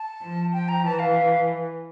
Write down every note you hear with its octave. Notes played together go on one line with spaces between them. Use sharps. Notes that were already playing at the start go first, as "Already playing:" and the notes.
Already playing: A5
F3
G5
A#5
E3 A5
F5